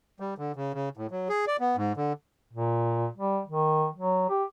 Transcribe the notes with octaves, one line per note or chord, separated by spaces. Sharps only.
G3
D3
C#3
C#3
A2
F#3
G#4
D5
B3
G#2
D3
A#2
G3
D#3
F#3
G4